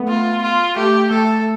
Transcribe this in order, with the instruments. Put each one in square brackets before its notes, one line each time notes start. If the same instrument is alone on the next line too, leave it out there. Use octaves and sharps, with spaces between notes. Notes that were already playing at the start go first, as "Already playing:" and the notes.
Already playing: [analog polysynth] A3 B3
[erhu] F4
F4
[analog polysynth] A3 [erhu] G4
[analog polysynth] A3 [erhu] A4